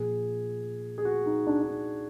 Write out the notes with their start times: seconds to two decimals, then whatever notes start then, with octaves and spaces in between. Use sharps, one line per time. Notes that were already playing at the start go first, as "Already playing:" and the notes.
Already playing: A#2 F3 G#4
0.98 G#4
1.05 F#4
1.26 D#4
1.47 D4
1.61 D4
1.68 D#4